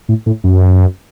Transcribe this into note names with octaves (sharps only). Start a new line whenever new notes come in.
A2
A2
F#2